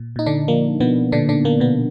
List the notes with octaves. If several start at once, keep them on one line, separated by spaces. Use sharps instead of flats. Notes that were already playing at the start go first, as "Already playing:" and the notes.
Already playing: A#2
A#2 D#4
D3 D4
F3 A#3
B2 F3 B3
A#2 D3 D4
D3 D4
A#2 A#3
B2 B3